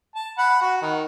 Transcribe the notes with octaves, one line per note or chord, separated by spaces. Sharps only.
A5
F#5 B5
F#4
D#3